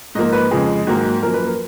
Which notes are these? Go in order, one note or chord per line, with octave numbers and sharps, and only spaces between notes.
G#2 F3 A#3 D#5
B4
F2 C#3 F3 G#3 G#4
G#2 D#3 F#3 A#3
F#2 F3 A#3 A#4
B4
A#4